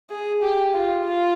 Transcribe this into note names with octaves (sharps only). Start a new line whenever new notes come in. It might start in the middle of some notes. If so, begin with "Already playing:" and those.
G#4
G4
F4
F4